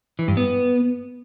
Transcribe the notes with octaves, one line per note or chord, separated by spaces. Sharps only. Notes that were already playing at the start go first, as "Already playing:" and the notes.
E3
G2
B3